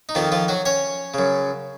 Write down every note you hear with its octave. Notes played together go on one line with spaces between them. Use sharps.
D#4
F2 D#3 F3 F4
F3 F4
F#3 F#4
C#4 C#5
F#2 C#3